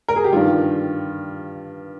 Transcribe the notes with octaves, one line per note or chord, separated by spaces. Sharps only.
A#4
G#4
G4
G2 D#3 G3 F4